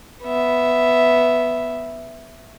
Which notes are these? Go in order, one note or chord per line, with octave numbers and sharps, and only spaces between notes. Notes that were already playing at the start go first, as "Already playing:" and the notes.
B3 E5